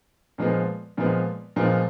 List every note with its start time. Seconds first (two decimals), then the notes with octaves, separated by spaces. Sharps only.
0.38 A#2 F3 G#3 B3
0.97 A#2 F3 G#3 B3
1.56 A#2 F3 G#3 B3